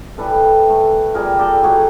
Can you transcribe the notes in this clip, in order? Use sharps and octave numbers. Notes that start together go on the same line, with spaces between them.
A2 E3 G3 A4 B4
A2 E3 A3
A#2 G3 G#4 A#4
G4 A4
A2 F#3 A3 F#4 G#4